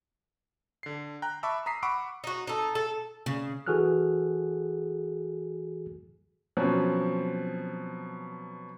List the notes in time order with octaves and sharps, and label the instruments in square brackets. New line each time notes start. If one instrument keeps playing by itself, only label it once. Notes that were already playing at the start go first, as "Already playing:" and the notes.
[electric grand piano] D3 C7
G5 A#5 F#6
E5 A5 B5 C#6 D6 E6
A#5 D#6 B6 C7
F#5 B5 C#6 D6 E6 D7
[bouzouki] D#4 F#4
D#4 A4
A4
[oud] C#3
[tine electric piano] E3 F#4 G#4 A4 F6 F#6
[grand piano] B2 F3 F#3 C4 C#4